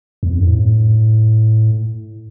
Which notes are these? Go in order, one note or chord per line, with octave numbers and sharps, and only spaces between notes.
E2
F2
G2
A2